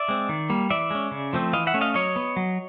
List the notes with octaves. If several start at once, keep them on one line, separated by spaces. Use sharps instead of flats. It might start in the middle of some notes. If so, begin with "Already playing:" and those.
Already playing: D5 E5
G#3 C4
D#3
G3 A#3
E3 D5 E5
G#3 C#4
C#3
F3 A3 C4
E3 D#5 F5
E5 F#5
A3 C#4
D#5 F5
F#3 C#5 D#5
B3
F#3